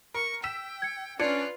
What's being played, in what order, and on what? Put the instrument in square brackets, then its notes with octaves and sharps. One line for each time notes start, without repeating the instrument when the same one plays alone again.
[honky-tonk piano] A#4 [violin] C#6
[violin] G5 [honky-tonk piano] E6 B6 E7
[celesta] G#6 C#7
[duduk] C#4 [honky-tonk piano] D4 [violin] F4 B4 [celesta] D5 G#6 C#7